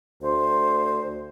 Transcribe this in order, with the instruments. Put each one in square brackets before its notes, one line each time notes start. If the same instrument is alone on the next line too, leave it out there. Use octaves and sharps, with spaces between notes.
[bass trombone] D2 [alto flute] C5